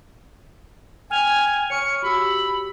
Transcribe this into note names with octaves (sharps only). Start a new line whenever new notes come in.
G5 G#5 F6 F7
C#5 C#6 F6 C#7
F#4 G4 B5 E6